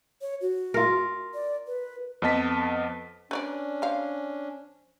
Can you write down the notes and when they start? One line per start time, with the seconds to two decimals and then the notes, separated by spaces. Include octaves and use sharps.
0.21 C#5
0.41 F#4
0.74 F4 A#4
1.34 D5
1.67 B4
2.22 F2 B3 D#5 A5 B6
3.31 C#4 D4 B4 C#5 D5
3.82 F3 F5